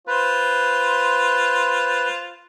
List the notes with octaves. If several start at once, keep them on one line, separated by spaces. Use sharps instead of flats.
F4 B4 C5